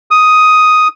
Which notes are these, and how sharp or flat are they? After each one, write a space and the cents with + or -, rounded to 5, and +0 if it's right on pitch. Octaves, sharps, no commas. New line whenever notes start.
D#6 +5